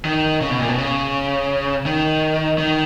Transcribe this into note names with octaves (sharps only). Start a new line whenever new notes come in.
D#3
C#3
B2
A#2
B2
C#3
D#3
D#3